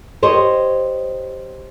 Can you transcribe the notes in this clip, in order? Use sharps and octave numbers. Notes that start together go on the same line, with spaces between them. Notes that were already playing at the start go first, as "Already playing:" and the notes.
G4 C5 C#5 D#5